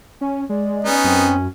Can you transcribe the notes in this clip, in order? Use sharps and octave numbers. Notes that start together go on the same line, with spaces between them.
C#4 G#5
G#3 D5
B3 C#4 D#4
F#2 C4